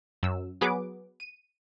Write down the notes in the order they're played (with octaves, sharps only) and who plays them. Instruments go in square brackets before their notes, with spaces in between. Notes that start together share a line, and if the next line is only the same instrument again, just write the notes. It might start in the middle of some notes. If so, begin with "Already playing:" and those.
[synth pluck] F#2 E6
F#3 B3 G#4 B4 D6 D7
D#7